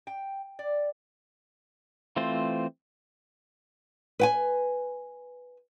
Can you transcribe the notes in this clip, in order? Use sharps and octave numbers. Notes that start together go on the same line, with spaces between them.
G5
D5
E3 A3 C4 F4 C5
B4 G5 G#5